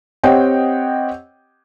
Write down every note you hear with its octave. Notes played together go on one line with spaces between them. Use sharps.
C4 G4 C#5 D#5 F#5 G5